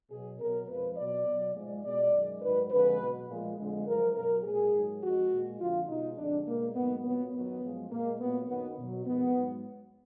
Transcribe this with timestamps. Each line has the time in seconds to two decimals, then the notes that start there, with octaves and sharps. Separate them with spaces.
0.10 B2 F#3 G#4
0.39 B2 F#3 A#4
0.68 F2 F3 G#3 B4
0.97 B2 F#3 D5
1.27 B2 F#3
1.55 G#2 F3 G#3
1.84 B2 G#3 D5
2.12 F#2 D#3 G#3
2.41 G#2 D#3 F#3 B4
2.70 F2 D3 F3 G#3 B4
2.99 B2 F#3
3.28 A#2 F3 G#3
3.57 F2 D3 F3 G#3
3.86 F#2 F3 G#3 A#4
4.15 B2 F#3 A#4
4.44 A#2 G#3 G#4
4.72 G#2 D#3 F#3
5.02 F2 D#3 G#3 F#4
5.31 A#2 G#3
5.59 F2 D3 F3 F4
5.88 B2 G#3 D#4
6.17 F2 D3 G#3 D4
6.46 B2 G#3 A#3
6.75 G#2 D#3 F#3 B3
7.04 A#2 F#3 B3
7.33 F#2 D#3 F#3 B3
7.62 F#2 F3 G#3
7.90 A#2 G#3 A#3
8.20 A#2 F#3 B3
8.48 F#2 D#3 F#3 B3
8.77 B2 F#3
9.06 F2 D#3 G#3 B3
9.35 G#2 F#3